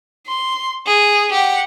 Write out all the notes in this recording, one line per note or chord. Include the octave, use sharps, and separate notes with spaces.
C6
G#4
G4 F#5